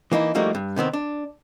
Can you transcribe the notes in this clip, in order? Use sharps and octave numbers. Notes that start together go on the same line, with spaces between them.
E3 A#3 D#4 E4
F3 G3 A3 A#3 D#4 F#4
G2
C3 D#3 B3 C4
D4